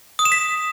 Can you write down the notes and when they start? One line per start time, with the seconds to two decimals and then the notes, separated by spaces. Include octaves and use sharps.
0.19 D#6
0.25 E7
0.32 B6